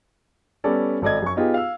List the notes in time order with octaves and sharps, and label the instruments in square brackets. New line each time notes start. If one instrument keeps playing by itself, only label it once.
[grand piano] G3 B3 C#4 A4 D5
G#1 A4 D5 D#5 G#6
F#2 C#6
B3 D#4 F4 G4 G#4
F5 E6